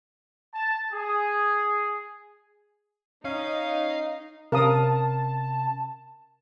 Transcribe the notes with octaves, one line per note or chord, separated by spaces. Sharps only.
A5
G#4
C#4 D#4 F5
C3 C#4 A#4 F5 A5 D#6